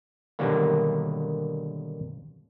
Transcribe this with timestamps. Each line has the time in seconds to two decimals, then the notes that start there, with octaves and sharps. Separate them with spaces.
0.39 B2 D3 D#3 F#3 G3 A#3